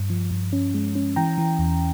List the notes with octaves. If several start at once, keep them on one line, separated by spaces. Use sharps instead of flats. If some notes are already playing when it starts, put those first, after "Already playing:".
Already playing: G2
F3
G2
C#4
G#3
C#4
E3 G5 A#5
E3
E2